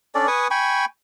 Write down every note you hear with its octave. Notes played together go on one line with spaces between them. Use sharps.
C#4 D4 A4 D5
B4 G#5 C#6 D#6
G5 G#5 B5 C#6